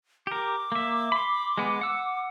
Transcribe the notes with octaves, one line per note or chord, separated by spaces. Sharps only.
G4 A#4 D6
A#3 E5
B5 C6
G#3 B3
F#5 E6